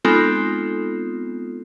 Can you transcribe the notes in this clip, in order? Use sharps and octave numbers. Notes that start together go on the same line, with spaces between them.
G#3 B3 C4 D#4 F4 A4